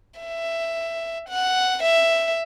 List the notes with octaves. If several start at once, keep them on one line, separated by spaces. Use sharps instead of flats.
E5
F#5
E5